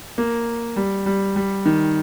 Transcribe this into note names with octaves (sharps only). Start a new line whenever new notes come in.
A#3
G3
G3
G3
D#3